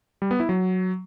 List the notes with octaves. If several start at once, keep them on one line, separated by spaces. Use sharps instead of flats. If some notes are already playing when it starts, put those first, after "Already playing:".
G3
B3
E4
F#3